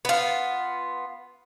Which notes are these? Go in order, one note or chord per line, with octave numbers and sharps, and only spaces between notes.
B3 F4